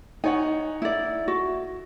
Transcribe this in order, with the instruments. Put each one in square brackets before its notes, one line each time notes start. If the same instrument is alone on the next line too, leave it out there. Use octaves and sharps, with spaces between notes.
[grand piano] D#4 C#5 F#5 [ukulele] G#5
[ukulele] E4 D5
F#4